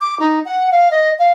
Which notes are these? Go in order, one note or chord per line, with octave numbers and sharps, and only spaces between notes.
D6
D#4
F#5
F5
D#5
F5